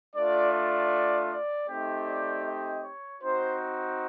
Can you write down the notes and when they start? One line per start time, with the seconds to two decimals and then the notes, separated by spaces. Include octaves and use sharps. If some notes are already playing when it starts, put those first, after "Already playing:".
0.15 A3 D4 F4 D5
0.53 D5
1.30 D5
1.69 A3 C4 D#4 G4
2.06 D5
2.45 D#5
2.83 C#5
3.22 C4 D#4 F#4 C5